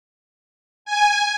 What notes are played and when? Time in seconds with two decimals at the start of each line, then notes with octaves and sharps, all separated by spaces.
0.85 G#5